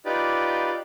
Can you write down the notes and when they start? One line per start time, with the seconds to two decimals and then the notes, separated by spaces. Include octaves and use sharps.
0.06 D#4 F4 G4 B4 D5